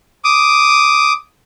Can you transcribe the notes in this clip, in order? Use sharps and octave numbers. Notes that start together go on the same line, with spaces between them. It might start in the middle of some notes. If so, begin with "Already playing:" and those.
D6 D#6